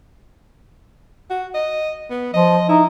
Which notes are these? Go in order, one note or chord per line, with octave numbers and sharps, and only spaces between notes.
F#4
D#5
B3
F3 D#5
D#4 E4